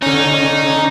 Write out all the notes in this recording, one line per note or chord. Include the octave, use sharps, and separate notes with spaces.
D3 C#4 D#4